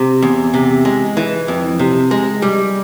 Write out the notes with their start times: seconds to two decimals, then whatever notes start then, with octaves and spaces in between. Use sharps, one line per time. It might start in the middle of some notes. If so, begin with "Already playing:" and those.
Already playing: C3
0.22 E2
0.54 C3
0.85 G#3
1.17 E3
1.48 F2
1.79 C3
2.11 G#3
2.42 G3